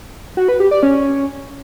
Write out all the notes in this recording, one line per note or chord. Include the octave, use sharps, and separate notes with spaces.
F#4
B4
G4
D5
C#4